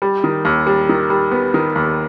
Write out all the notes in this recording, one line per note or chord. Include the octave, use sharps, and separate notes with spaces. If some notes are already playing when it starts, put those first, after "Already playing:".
G3
D#3
D#2
G3
D#3
G3
B3
D#3
D#2